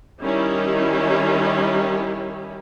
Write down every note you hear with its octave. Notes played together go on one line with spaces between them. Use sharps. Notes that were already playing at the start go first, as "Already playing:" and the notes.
D#3 G3 C#4 E4